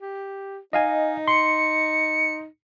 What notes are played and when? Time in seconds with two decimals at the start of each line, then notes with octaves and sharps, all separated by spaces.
0.02 G4
0.73 D#4 D#5 F5 G#5
1.28 C6 C#7